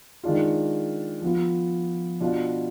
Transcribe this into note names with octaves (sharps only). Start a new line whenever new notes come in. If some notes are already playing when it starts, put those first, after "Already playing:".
D#3 G#3 D4 F4
F3 B3 F4
B2 B3 D4 F4